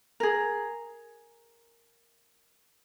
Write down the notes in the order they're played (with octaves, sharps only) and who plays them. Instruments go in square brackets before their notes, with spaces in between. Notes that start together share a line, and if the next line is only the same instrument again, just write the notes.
[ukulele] G#4 A#4